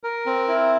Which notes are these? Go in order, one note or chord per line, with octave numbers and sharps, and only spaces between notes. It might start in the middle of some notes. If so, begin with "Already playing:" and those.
A#4
C4
E4